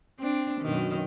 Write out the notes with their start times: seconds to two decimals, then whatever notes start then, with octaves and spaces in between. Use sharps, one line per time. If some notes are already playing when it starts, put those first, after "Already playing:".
0.19 C4 D4
0.61 F#2 B2 D#3